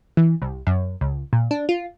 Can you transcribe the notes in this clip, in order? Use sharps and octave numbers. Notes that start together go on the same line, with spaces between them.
E3
C2
F#2
C#2
A#2
D4
F4